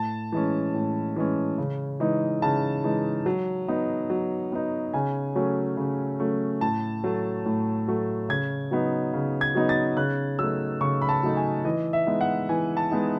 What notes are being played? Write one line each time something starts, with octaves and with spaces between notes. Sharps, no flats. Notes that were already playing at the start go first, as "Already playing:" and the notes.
Already playing: A2 A5
E3 G#3 C#4
A2
E3 G#3 C#4
C#3
E3 G#3 D#4
C#3 A5
E3 G#3 D#4
F#3
B3 D#4
F#3
B3 D#4
C#3 G#5
F#3 A3 C#4
C#3
F#3 A3 C#4
A2 A5
F#3 A3
A2
F#3 A3
C#3 G#6
F#3 B3 D#4
C#3
G#6
F#3 B3 D#4
A6
C#3 F#6
F#3 A3 D#4 E6
C#3 C#6
B5
A5
F#3 A3 D#4
G#5
E3 D#5
E5
G#3 B3 D#4
F#5
E3 G#5
A5
G#3 B3 D#4